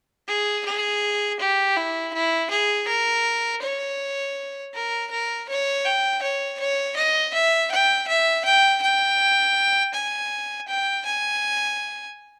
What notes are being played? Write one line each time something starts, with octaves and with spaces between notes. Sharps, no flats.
G#4
G#4
G4
E4
E4
G#4
A#4
C#5
A#4
A#4
C#5
G5
C#5
C#5
D#5
E5
G5
E5
G5
G5
G#5
G5
G#5